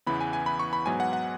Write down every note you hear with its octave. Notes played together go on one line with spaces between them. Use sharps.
E2 C#3 E3 B3 B5
G#5
G#5
B5
C#6
B5
G#2 F#3 B3 G#5
F#5
F#5